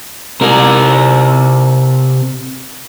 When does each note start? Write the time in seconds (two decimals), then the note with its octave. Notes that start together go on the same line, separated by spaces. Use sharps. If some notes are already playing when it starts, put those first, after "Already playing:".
0.41 C3 A#4